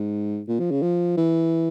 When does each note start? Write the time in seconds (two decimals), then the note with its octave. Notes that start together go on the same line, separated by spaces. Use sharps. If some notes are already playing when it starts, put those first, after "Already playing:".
Already playing: G#2
0.48 A#2
0.59 F3
0.71 C#3
0.82 F3
1.17 E3